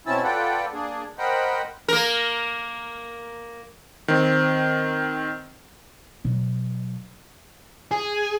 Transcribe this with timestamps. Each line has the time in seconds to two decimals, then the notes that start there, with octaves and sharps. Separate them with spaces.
0.07 B2 C4 C#4 E4 A5 E6
0.23 F4 A4 B4 D5 F#5 G5
0.73 A#3 D4 G#4
1.18 A#4 C5 D#5 F#5 G5 B5
1.88 A#3 A#4
4.08 D#3 C4
6.25 B2 F#3
7.91 G#4